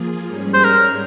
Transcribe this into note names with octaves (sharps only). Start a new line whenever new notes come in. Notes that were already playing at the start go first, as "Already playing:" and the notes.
Already playing: F3 A#3 F4 G#4
G#2 G3 C#4 G#4
C5
A#4